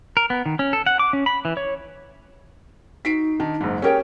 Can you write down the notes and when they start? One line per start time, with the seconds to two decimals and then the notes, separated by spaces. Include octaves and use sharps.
0.17 A#4
0.30 B3
0.46 D#3
0.59 C#4
0.73 A4
0.86 F#5
0.99 D6
1.13 C#4
1.26 B5
1.45 E3
1.57 C#5
3.05 D#4 F#4 B6 C7 D7
3.40 D#3 D4
3.61 F#1 G#2
3.82 C#4 G4 G#4 A#4 C#5 G5